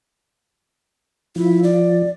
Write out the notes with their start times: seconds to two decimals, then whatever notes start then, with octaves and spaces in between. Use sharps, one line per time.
1.36 F3 E4
1.63 D5